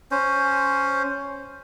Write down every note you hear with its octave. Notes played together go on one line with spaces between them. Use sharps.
C#4 C5